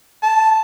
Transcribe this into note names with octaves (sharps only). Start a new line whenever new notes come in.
A5